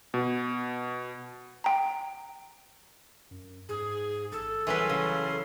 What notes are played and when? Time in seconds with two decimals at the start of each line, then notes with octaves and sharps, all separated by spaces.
0.14 B2
1.64 G5 A#5
3.31 F#2
3.69 G#2 G#4
4.32 A1 A4
4.67 C2 E3 F#3 C#4 G#4 B4 C6
4.90 C#3